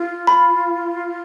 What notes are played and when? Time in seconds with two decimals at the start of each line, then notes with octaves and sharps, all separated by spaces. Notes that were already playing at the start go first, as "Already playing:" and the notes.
Already playing: F4
0.27 B5